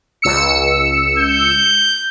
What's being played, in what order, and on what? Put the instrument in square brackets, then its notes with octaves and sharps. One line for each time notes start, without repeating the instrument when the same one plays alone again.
[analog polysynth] C#2 E6 C#7
[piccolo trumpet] G6